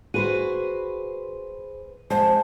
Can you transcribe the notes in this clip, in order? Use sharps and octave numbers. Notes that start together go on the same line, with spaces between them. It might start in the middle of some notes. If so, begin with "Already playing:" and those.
F#4 G#4 B4 C5 D#7
F2 G#3 C5 A5